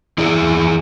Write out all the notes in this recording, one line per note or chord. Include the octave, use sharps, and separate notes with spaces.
E3 E4 G#4 D5